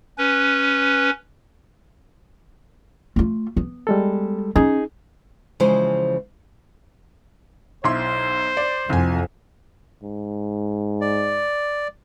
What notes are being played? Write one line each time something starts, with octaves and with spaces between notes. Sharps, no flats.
C#4 B4
A3 F4
B3
G3 G#3 A4
C#4 D#4 G#4
C#3 E3 F3 G#3 G#4 C5
B1 E4 C5 C6
D5
C2 F2 G#5
G#2
D5